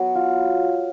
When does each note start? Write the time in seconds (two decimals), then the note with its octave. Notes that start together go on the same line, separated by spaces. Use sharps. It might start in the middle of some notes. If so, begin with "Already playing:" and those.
Already playing: F#3 B3
0.15 F4